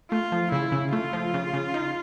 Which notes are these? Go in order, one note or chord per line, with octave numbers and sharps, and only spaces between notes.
A3 F4
F3
C#3 E4
C#3
A3 F4
F3
C#3
C#3
D#4